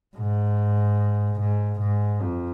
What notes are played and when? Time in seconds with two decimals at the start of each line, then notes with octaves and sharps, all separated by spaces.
0.17 G#2
1.40 G#2
1.80 G#2
2.22 F2